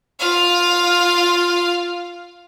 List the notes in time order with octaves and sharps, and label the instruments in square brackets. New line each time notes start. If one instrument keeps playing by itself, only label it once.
[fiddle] F4 F5